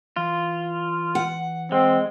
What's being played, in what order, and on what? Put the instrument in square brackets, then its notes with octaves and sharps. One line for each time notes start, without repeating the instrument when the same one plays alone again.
[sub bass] E3 [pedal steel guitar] F4
[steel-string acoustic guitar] F#5
[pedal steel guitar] G#3 [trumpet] C4